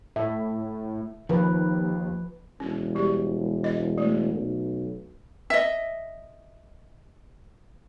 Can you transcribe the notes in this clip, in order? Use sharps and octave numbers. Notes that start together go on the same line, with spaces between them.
A2 E5
D#2 D#3 F3 B4
E1 C#4
G3 G4
D#5
A3
B1
D#5 E5